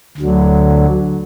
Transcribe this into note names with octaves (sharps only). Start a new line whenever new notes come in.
D2 D3 F#3